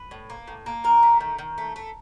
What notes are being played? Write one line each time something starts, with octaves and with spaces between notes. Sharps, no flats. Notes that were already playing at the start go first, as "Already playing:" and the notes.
Already playing: B4
A2
A#3
A2
A#3
D#3 A#4
A3
D#3
D#3
A3
A3